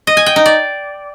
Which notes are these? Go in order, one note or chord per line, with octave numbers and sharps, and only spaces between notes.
D#5
G#5
G5
D#4
D5